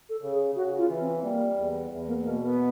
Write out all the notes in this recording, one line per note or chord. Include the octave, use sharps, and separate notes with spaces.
A4
C#3
G#4
C#3 F#4
F4
E3
C4
G3 A#3
E2
E2
A#3
B2 A#3
B3